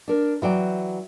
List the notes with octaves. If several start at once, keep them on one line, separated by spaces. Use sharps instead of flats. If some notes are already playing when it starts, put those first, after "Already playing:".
D4 A#4
E3 F#3 D5 G5